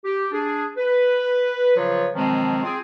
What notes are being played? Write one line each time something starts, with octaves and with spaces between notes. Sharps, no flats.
G4
D4 G#4
B4
C#3 F3 F#3 F4 B4 C#5
B2 D#3 F3 F#3 G#3 C4
C4 F4 G#4